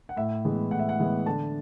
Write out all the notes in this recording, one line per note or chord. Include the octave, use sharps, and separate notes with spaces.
F#5
A2 E5
E3 G#3 B3
A2 F#5
E5
F#5
E3 G#3 B3
D3 A5